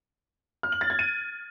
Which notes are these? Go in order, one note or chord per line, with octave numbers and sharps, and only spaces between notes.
F6
F#7
A6
G#6
D#7